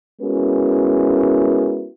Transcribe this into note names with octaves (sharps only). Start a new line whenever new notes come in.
G#3 B3 C#4 E4 F#4 A#4